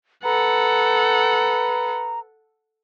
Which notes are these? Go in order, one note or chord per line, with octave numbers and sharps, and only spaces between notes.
A4 B4 F#5 A#5